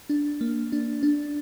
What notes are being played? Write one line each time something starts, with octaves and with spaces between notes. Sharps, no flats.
D4
A#3
D4
D4